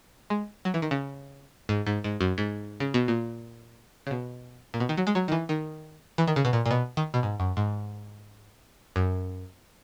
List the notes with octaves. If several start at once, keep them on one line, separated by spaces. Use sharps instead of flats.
G#3
F#3
E3
D#3
C#3
G#2
G#2
G#2
F#2
G#2
C#3
B2
A#2
C#3
B2
A#2
B2
D#3
F#3
G#3
F#3
D#3
E3
D#3
E3
D#3
C#3
B2
A#2
A#2
B2
D#3
B2
G#2
F#2
G#2
F#2